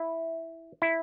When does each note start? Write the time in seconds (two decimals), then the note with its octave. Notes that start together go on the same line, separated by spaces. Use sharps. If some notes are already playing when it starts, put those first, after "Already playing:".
Already playing: E4
0.82 E4